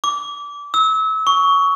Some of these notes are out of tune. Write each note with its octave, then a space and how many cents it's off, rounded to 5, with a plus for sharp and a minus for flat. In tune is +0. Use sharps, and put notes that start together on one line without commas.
D6 -25
E6 -35
C#6 +15